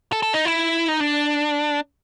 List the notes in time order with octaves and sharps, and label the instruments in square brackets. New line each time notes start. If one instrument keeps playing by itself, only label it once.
[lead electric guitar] A4
A4
D#4
E4
D#4
D4